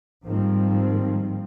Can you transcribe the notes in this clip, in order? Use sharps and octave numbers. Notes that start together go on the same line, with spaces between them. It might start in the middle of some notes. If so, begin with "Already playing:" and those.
G#2 D#3 F3 G3 A#3 C4